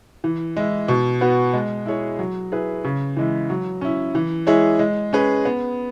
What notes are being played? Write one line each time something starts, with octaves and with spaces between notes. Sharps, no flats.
E3
G#3 E4
B2
B3 F#4 B4
G#3
E4 G#4 C#5
F#3
E4 G#4 B4
C#3
E3 G#3 E4
F#3
C#4 E4
E3
G#3 E4 G#4 C#5
G#3
C#4 G#4 B4
B3